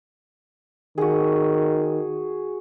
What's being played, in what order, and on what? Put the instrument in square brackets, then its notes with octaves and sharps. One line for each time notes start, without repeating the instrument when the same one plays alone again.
[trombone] D#3 [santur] F#4 G#4